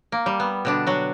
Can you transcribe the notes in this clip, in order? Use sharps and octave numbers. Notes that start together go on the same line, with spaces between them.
A#3
G3
B3
B2 D3 D4
F#3 F#4